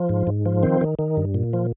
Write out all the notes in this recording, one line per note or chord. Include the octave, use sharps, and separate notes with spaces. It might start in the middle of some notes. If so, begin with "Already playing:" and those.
Already playing: F3
G#2
G#2
F3
D#3 C4
D#3
D#3
G2
A#2
F3